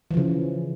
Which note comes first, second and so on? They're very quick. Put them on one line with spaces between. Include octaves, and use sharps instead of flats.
E3 F3 C#3